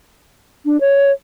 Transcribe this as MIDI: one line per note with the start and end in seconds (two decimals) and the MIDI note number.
0.65 0.80 62
0.80 1.11 73